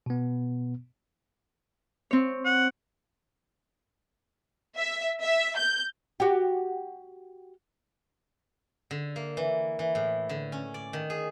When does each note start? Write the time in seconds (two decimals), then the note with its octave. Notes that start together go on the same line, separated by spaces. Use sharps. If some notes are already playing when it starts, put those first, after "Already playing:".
0.06 B2 B3
2.11 C4 C#5
2.45 F#5
4.77 E5
5.22 E5
5.57 G6
6.20 F#4 G4
8.91 D3
9.16 A#3
9.37 E3
9.79 E3
9.95 A2
10.29 D3
10.52 C#4
10.74 D5
10.93 D#3
11.10 G#4